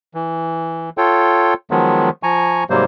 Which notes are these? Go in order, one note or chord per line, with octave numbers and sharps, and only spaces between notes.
E3
F4 A4 C#5 G5
D#3 F3 F#3 G#3 B3
F3 G#5 A#5 C#6
G#2 C3 F#3 G3 A#3 C5